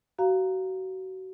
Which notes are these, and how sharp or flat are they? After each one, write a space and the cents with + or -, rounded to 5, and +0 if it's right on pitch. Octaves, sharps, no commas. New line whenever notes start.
F#4 +30 F5 +0 A#5 +0